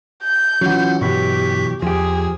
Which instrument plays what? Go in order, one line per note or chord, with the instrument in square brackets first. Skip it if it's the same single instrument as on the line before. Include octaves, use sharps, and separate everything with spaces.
[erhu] G6
[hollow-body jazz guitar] E3 F#3 [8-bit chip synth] C#4 F4 F#5
[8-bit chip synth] G2 C#6 B6 [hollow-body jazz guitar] B2 E3 F#3 [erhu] G4
[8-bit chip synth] E2 [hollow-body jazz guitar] F3 G4 [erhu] G#4